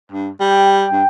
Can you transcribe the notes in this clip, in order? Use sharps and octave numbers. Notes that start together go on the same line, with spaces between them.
G2
G3 G5
G2